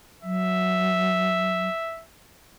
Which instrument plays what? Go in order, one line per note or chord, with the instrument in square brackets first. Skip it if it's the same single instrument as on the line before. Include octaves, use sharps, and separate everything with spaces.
[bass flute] F#3 [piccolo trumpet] E5